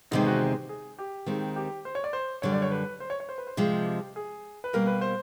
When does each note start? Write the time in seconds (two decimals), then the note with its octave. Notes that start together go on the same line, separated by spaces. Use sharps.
0.11 E2 C3 D#3 G#3 C4 D#4
0.26 F#4
0.41 G4
0.69 G#4
0.99 G4
1.26 D#2 D#3 G#3 C4
1.56 G4
1.85 C5
1.95 C#5
2.04 D5
2.13 C5
2.42 F#2 D3 G3 C#5
2.52 D5
2.62 C#5
2.71 B4
3.00 C5
3.10 C#5
3.20 C#5
3.29 C5
3.38 B4
3.47 C5
3.57 C3 F3 G#3
3.86 G4
4.16 G#4
4.64 B4
4.73 B2 G3 A#3 A#4
4.87 B4
5.01 C5